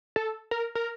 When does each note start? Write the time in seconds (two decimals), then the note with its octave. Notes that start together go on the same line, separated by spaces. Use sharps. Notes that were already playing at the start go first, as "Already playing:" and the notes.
0.16 A4
0.51 A#4
0.75 A#4